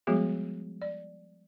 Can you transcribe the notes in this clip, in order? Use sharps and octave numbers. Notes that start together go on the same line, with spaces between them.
F3 G3 G#3 B3 F#4 G#4
D5